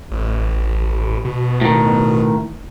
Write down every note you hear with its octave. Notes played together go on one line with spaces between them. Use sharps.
A1
B2
A2 D#3